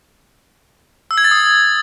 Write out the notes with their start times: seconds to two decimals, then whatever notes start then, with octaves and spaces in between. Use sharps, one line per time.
1.11 E6
1.18 G#6
1.24 A6
1.31 D#6